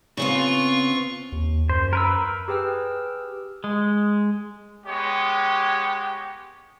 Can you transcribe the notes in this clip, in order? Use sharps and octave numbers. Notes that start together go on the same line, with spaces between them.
C#3 B3 C4 F4 C#6
D#2
F#2 C5
A#4 B4 E6
G4 G#4 B4 G5 E6 F6
G#3
G#3 B3 G4 C#5